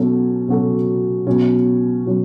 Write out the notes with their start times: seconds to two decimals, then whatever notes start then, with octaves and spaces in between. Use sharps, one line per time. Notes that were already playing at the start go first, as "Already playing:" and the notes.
Already playing: B2 F#3 C#4 F#4 A4
0.48 B2 F#3 C#4 F#4 A4
1.27 B2 F#3 C#4
2.06 B2 F#3 C#4